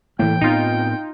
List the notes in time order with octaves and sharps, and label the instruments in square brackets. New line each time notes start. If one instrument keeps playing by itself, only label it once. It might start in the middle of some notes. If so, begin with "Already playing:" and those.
[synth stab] A2 [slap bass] E3 A#3 [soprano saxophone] G5
[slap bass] A2 B3 C4 [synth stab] D#4 F4